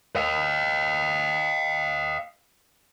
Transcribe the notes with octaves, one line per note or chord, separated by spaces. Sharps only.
D#5 F5